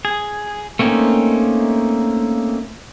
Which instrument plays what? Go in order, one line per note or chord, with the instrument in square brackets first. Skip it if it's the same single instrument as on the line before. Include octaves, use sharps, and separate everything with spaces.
[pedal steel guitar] G#4
A3 A#3 C4 C#4 D#4